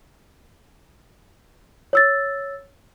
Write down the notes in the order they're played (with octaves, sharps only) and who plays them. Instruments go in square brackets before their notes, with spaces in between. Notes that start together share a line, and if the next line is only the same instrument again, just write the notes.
[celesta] C#5 E6 A6